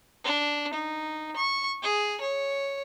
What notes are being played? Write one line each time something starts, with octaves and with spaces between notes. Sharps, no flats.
D4
D#4
C#6
G#4
C#5